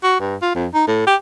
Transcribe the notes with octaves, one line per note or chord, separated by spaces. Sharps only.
F#4
G2
F4
F2
D#4
A2
G4